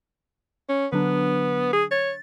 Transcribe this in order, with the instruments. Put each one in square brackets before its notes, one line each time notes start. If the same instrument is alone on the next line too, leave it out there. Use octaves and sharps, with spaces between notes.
[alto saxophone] C#4
[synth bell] D3 F#3 D4 [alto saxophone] B3
[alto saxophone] G#4
[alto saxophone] C#5 [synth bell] A6